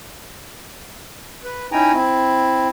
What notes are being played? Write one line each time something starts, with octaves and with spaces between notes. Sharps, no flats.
B4
C#4 D#4 E4 G5 G#5 A#5
C4 E4